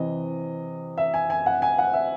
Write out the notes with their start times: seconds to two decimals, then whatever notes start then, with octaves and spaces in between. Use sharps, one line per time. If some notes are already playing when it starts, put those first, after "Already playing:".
Already playing: C3 E3 D#5
0.97 E5
1.14 G#5
1.30 G#5
1.46 F#5
1.62 G#5
1.78 F#5
1.93 E5